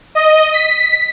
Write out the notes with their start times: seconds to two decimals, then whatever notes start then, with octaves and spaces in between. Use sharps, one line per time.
0.15 D#5
0.53 B6